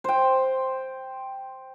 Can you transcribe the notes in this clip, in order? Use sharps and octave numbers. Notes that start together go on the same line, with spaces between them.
C5 G5